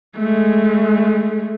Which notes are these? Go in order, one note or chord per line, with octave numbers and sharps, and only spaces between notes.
G#3 A3